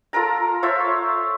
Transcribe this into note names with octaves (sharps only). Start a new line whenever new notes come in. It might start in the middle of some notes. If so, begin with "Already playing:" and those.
F4 A4 A#4 A#5
F4 C5 C#5 E5